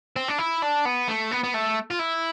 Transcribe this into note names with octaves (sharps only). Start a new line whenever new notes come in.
C4
D4
E4
D4
B3
A3
B3
B3
A3
F4
E4